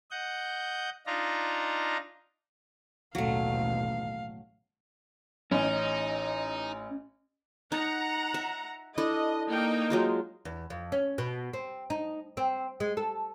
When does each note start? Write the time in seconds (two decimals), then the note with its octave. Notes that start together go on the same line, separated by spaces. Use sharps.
0.11 D#5 F#5 G6
1.06 D4 D#4 F4 A#5
3.15 A1 D#2 B2 F#3 A3 F5
5.51 A1 C#4 D#4 G#5
7.72 D#4 F#5 A#5
8.34 E5
8.98 D4 E4 A4 D#5
9.50 A#3 D#4 G5
9.90 F#3 G#3 F4
10.45 E2
10.70 F2
10.92 C#4
11.18 B2
11.53 C4
11.90 D#4
12.37 C4
12.80 G#3
12.97 A4